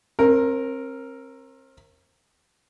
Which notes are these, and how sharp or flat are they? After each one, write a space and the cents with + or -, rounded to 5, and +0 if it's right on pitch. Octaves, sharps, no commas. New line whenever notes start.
C4 +35 A#4 +0